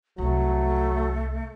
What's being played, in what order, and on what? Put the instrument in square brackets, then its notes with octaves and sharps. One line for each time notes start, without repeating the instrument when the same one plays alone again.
[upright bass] C2 [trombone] F#3 [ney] A3